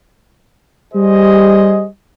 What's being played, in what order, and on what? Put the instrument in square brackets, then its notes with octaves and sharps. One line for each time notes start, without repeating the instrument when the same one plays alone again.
[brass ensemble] G3 G4 G#4 C5 D#5